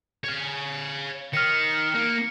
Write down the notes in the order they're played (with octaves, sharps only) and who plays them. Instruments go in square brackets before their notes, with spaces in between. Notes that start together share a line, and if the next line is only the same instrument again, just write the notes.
[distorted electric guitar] C#5 F5
[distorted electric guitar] D#3 [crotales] F6 C#7
[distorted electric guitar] A#3